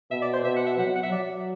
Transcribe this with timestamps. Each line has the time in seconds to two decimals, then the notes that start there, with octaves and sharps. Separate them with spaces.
0.11 B2 E5
0.22 D5
0.33 C5
0.44 B2 E5
0.56 F#5
0.66 E5
0.78 F#3 F#5
0.96 F#5
1.03 E5
1.11 F#3 D5